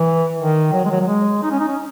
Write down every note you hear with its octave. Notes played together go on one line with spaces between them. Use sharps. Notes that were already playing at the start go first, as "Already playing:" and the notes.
Already playing: E3
D#3
F#3
G#3
F#3
F#3
G#3
D#4
C#4
D#4
C#4